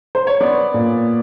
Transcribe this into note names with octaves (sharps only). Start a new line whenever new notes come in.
C5
C#5
B3 D5
A#2